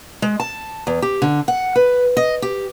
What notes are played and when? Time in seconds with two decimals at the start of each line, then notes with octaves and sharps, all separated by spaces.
0.22 G#3
0.40 A5
0.87 E2
1.02 G4
1.22 D3
1.48 F#5
1.76 B4
2.17 D#5
2.42 G4